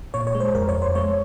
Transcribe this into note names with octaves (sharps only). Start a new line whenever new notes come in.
A#2 C#5
C#5
G#3
C5
F2 A#4
C#5
F2
C5
G#3 C#5